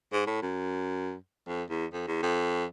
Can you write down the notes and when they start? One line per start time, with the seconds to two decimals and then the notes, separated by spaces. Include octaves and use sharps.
0.13 G#2
0.27 A2
0.42 F#2
1.47 F2
1.70 E2
1.93 F2
2.08 E2
2.23 F2